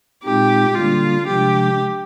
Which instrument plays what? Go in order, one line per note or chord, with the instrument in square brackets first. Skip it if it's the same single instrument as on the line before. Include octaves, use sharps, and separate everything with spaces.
[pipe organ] A#2 G#3 C4 D#4 [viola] G4
[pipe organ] D3 G3 A#3 D4 [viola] F4
[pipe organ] C3 F3 G#3 D4 [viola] G4